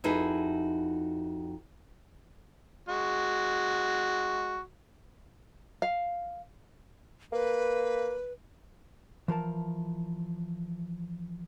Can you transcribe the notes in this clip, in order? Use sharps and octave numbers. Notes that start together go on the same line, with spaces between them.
F2 D#4 E4 F#4 G#4 B4
G#3 F#4
F5
A#3 B4
E3 F3 A#4 A5